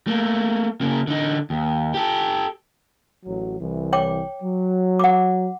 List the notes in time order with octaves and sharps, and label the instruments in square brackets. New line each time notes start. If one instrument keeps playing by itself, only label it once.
[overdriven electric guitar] A3 A#3
C#3 A#3
D3 D#4
D#2
G4 A4
[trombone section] A1 F#3
C2 E3
[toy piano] C#5 G5 D6
[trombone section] F#3
[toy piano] F#5 D6